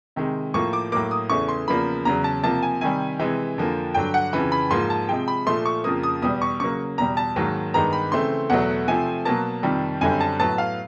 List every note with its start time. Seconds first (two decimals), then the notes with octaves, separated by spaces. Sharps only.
0.16 C3 D#3 G#3
0.54 A2 F3 A#3 C#6
0.73 D6
0.92 A2 F#3 A#3 D6
1.11 D#6
1.30 E2 C#3 E3 A3 C#6
1.48 C6
1.68 E2 C#3 F3 A#3 B5
2.05 E2 C#3 F#3 A#5
2.24 A5
2.43 C3 F3 A#3 A5
2.63 G#5
2.81 C3 D#3 G3 G#5
3.19 C3 E3 G#3
3.58 F2 D3 F3 A#3
3.94 G2 D3 F#3 G5
4.14 F#5
4.33 F2 C#3 E3 B5
4.52 B5
4.71 G#2 F3 A#3 C6
4.90 A5
5.08 C3 F3 G#3 G5
5.28 B5
5.47 A#2 F3 A3 C6
5.66 C#6
5.84 F2 C#3 F3 A#3 D#6
6.03 D#6
6.22 E2 B2 G3 D#6
6.42 C#6
6.60 C#3 F#3 A#3 C#6
6.98 E2 B2 G3 A#5
7.17 A5
7.36 G#2 D#3 F#3 A#3
7.74 G2 D#3 G#3 B3 A#5
7.93 B5
8.12 C#3 E3 A3 C4 C6
8.50 E2 B2 F#3 A3 F#5
8.88 C3 F3 A3 C4 G#5
9.25 B2 F#3 A#3 A5
9.63 F2 C3 D#3 G3
10.01 F#2 D3 G3 C4 G#5
10.21 A5
10.40 A2 F#3 B3 A5
10.58 F5